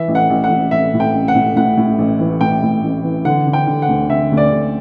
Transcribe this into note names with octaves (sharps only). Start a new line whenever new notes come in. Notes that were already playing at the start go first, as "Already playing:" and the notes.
Already playing: E3 E5
A1
F#5
A1
F#5
A1
A1 E5
A2
G5
A1
F#5
A2
A2 F#5
A2
A1
E3
A2 G5
A2
A1
E3
D3 F#5
D3
G5
D3
F#5
D2
D3 E5
D2
D5
D2